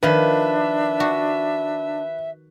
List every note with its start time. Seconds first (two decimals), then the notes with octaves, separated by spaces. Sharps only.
0.03 D#3 F3 D4 B4 E5
1.00 F#4